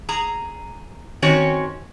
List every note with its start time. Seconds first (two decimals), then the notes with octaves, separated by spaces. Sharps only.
0.09 G#4 A#5
1.22 D#3 C4 C#4 F#4 C#5